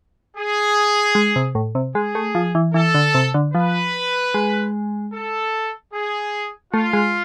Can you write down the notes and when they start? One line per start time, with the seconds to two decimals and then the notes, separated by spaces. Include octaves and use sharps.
0.36 G#4
1.15 G#3
1.36 C3
1.55 A2
1.75 C3
1.95 G#3 G#4
2.15 A3
2.35 F3
2.55 E3
2.74 E3 A4
2.95 D3
3.15 C3
3.34 D3
3.54 F3 B4
4.34 G#3
5.14 A4
5.94 G#4
6.74 A3 F4
6.93 G#3